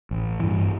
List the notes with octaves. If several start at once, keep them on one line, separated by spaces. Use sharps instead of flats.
A1
G2 E3